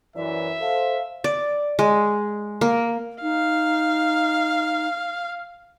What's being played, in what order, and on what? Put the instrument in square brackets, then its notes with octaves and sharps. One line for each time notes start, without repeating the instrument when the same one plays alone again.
[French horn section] F#2 E3 [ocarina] D5 [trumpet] E5
[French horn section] A4 C5 [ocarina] F5
[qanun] D5
G#3
A#3
[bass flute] D#4 [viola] F5